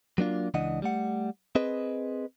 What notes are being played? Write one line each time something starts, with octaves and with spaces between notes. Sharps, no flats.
F#3 A#3 D4 F4
C#2 E3 D4 D#5 F#5
G3 A3 F#5
C4 G#4 B4 D#5